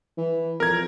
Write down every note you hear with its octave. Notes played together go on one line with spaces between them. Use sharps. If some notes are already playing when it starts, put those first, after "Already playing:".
E3
F2 A#4 G#6